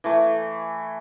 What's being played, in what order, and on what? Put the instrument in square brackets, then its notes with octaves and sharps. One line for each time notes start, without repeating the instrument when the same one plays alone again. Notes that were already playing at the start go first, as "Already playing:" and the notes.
[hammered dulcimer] E3 A3